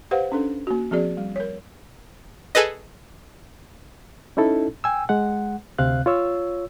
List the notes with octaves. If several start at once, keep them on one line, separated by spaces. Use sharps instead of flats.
G4 B4 C5 F5 F#5
C#4 D4 A4
A#3 F#4
F3 C4 F#4 G#4 D5
G3
A#4 C#5
G#4 A4 B4 D#5
C#4 D#4 E4 A4
G5 G#5 E6
G#3 F#5
D2 C3 C4 F5 F#6
F4 C#5 E6